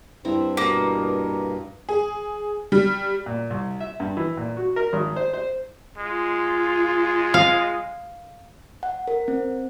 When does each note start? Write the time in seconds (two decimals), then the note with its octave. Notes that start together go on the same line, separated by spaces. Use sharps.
0.25 G2 C4 E4 A#5
0.57 B2 A#3 B3 A#4
1.89 G#4
2.72 G3
3.26 A#2
3.50 C2
3.80 E5
4.00 G2
4.17 E3
4.37 A#2
4.57 F#4
4.76 A#4
4.93 G#1
5.16 C5
5.33 C5
5.98 G#3 F4
7.34 F5
8.83 F#5
9.08 A#4
9.28 C4